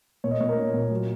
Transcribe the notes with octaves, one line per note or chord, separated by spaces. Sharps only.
A#2 C#5
D#5
A#2 C#5
A#4
A#3
A#2
F#3